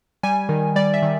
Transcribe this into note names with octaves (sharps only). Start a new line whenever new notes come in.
G3 G#5
D#3
G3 D5
E5
D#3